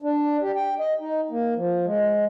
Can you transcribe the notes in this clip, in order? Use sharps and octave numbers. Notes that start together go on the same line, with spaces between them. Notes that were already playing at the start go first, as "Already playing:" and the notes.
D4
G4
G5
D#5
D#4
A#3
F3
G#3